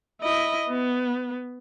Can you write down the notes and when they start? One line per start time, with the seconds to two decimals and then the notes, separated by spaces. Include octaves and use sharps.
0.21 E4 D#5
0.69 B3